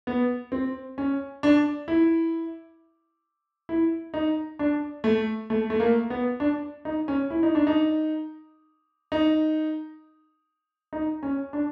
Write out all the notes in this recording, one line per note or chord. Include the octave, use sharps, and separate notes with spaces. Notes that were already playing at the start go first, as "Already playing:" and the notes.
B3
C4
C#4
D4
E4
E4
D#4
D4
A3
A3
A3
A#3
B3
D4
D#4
C#4
E4
D#4
D4
D#4
D#4
D#4
C#4
D4